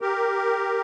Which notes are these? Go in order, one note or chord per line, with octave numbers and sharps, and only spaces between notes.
G4 A#4